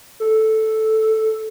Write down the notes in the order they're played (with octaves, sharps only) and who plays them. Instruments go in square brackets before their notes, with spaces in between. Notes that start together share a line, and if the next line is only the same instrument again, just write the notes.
[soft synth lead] A4